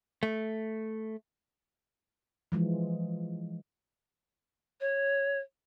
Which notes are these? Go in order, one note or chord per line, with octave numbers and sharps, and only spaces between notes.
A3
E3 F3 G#3
C#5